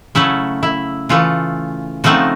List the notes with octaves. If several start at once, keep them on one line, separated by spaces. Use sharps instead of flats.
C#3 F#3 A3 C#4 E4
E4
C#3 E3 A3 F4
C#3 F3 A3 C4 D#4 F#4